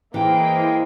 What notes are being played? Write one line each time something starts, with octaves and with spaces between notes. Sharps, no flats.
E3 G#3 A#3 E4 C5 G5